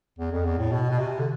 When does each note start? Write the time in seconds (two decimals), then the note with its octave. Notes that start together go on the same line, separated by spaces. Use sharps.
0.19 E2
0.32 F2
0.45 E2
0.58 A2
0.71 B2
0.91 B2
0.99 C3
1.19 D3